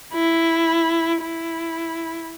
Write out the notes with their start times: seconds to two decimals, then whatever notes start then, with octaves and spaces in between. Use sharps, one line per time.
0.13 E4
1.22 E4